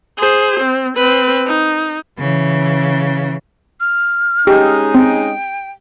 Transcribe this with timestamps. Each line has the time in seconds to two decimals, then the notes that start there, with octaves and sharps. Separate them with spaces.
0.18 G#4 C5
0.60 C4
0.97 C4 B4
1.46 D#4
2.18 C#3 E3
3.80 F6
4.47 G#3 C#4 D#4 G4
4.95 C4 G5